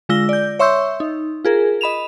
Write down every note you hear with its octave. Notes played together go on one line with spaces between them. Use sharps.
D3 G#3 F4 E6 A#6 G7
D5 G6
C#5 E5 C6 C#6 E6 G6
D#4
F4 G#4 A#4
D#5 B5 E7 F7